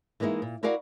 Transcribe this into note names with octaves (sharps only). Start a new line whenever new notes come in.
E3 G#3 A#3 D#4 E4
A#2
E4 F#4 A#4 D5 F5 F#5